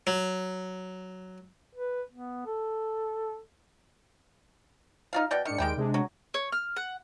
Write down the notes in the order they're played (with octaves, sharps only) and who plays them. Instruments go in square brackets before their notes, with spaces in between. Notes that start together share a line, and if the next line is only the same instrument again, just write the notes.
[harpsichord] F#3
[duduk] B4
B3
A4
[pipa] D#4 F4 F5
B2 D5 G5
[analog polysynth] G#2 D4 C#7 [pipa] D#3
[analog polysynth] D#2 G#3 D7 [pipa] D#3 G3 G5
[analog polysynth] C3 G#3 D4
[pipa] F#3
[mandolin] C#5
F6
F#5